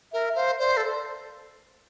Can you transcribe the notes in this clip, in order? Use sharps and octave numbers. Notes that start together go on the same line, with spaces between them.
A#4 E5
C5 F5
C5 D5
A4